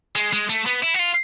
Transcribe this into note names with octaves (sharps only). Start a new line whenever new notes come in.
G#3
G#3
A3
B3
E4
F#4
F4